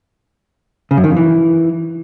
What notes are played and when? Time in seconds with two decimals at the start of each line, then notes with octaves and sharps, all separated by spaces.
0.91 C#3
0.97 F#2
1.04 D#3
1.10 F2
1.17 E3